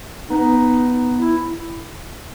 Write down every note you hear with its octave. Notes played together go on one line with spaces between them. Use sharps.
B3 D#4
E4